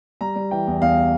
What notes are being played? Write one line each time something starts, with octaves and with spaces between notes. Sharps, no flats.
G3 A#5
G3
E3 G5
E2
E2 F5